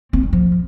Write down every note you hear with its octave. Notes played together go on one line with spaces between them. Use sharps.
C4
G3
F3